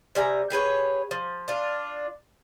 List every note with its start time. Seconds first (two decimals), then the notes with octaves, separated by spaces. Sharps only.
0.15 C3 G3 G#5 A#5
0.50 G4 G#4 B4 C#5
1.11 F3
1.48 D4 F4